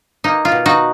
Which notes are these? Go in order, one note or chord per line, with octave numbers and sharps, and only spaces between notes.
A#3 D#4
F4
B2
D#4 F#4